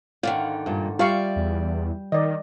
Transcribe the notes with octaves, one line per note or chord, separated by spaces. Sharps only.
G#2 D3 D#3 D5 F5
G2 A#2
G3 F4 D5 E5 F5 C#6
E2
D#3 D5 D#5